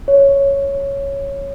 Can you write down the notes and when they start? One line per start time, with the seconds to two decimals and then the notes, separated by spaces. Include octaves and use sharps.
0.08 C#5